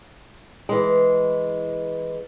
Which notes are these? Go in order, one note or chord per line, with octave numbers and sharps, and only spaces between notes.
E3 G#3